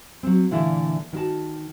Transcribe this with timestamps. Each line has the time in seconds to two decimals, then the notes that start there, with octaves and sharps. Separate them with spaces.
0.23 F#3 C4
0.51 A#2 D3 E3 A3 A#3 E4
1.13 D#3 F#4 A5